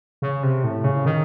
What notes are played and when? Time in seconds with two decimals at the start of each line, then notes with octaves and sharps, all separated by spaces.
0.22 C#3
0.43 C3
0.64 A2
0.84 C#3
1.05 D#3